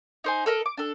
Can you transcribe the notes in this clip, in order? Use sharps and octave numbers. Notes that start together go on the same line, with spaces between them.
D#4 C5 G#5
A4 A#4 D#5
D6
D4 A4